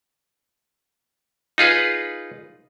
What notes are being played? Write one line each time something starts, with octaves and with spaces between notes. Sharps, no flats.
D#4 F4 G#4 B4